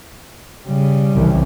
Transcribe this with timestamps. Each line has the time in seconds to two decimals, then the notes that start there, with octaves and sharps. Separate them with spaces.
0.68 C#3 G3
1.13 C2 E3